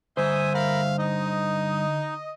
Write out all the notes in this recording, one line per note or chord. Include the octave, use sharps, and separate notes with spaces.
G2 D3 C5 E5 G#5 D#6
A#4 E5 F5 B5
D#4 D#5